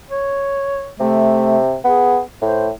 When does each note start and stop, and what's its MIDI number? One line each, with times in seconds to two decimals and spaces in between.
0.11 0.90 73
1.00 1.77 48
1.00 1.58 57
1.85 2.19 59
1.85 2.20 68
2.42 2.70 45
2.42 2.67 72